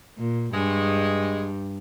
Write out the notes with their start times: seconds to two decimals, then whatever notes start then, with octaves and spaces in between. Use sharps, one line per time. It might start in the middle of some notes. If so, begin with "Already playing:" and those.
0.18 A#2
0.54 G2 G#3